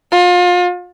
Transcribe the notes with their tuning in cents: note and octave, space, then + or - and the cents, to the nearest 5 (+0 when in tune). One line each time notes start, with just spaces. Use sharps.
F4 +30